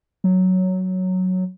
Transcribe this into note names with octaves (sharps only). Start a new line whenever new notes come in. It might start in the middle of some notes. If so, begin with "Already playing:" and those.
F#3